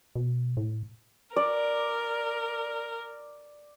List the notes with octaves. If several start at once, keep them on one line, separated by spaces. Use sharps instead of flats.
B2
A2
A#4 D5